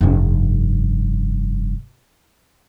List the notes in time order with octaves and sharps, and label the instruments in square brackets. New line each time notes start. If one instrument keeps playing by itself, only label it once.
[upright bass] F1 G2